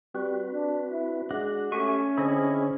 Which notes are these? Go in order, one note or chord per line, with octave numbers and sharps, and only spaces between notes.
G3 C4 F#4 B4
D4
E4
G#3 D4 F#4 F#5
A3 C#4 G4 E5 G#5 C#6
D3 C4 D4 E4 G#4 D#5 G#5